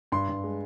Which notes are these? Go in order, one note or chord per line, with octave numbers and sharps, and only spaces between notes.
G2 C6
G2
G#3